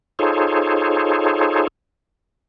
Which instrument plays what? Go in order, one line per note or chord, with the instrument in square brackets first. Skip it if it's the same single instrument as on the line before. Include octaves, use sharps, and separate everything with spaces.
[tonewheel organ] D#4 F4 G#4 A4 C5 C#5